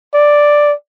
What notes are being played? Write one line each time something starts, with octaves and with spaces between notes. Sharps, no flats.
D5